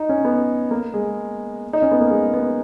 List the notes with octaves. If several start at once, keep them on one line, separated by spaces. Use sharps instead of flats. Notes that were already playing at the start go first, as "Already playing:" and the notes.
Already playing: D#4
C#4
B3
A#3
G#3
D#4
C#4
B3
A#3
G#3
B3